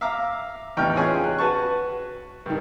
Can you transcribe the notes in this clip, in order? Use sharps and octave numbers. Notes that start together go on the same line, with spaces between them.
E5 F5 A#5 D6
A1 E2 D#4 G5 C#6 F6
C#4 F4 G#4 G#5 C#6
F#6
F#4 B4 A5 C#6
G2 D#3